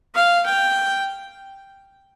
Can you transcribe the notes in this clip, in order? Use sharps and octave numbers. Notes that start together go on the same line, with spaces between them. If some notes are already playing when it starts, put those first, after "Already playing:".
F5
G5